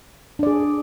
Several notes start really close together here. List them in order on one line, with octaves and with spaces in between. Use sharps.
D4 D5 G#4